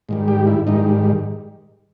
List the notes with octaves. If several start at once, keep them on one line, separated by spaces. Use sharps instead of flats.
G#2 D#3 G3
G4
E4
G#2 D#3 G3 D#4